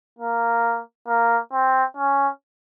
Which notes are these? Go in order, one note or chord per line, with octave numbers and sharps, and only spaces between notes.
A#3
A#3
C4
C#4